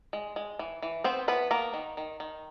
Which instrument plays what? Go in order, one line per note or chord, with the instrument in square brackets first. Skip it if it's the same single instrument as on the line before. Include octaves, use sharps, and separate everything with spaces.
[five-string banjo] G#3
G#3
E3
E3
B3 C4 C5
E3 B3 B4
A#3 B3 A#4
D#3
D#3
D#3